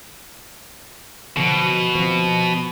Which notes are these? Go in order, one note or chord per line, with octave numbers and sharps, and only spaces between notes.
B2 D3 F3 F#3
F3 C4